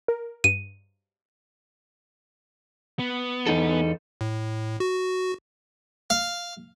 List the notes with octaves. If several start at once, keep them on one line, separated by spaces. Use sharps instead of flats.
A#4
G2 D#7
B3
E2 D#4 A4
A2
F#4
F5